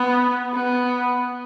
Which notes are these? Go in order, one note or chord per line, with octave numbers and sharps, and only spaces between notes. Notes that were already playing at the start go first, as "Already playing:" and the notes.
Already playing: B3
B3